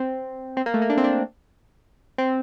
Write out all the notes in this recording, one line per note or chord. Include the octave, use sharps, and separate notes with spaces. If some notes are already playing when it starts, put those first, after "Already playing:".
Already playing: C4
C4
A#3
A3
A#3
D4
C4
D4
C4